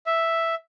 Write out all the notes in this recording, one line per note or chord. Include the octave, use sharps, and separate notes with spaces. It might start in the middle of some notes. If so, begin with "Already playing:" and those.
E5